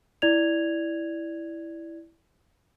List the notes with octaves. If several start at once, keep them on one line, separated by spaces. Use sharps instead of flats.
E4 D5 G#6 F7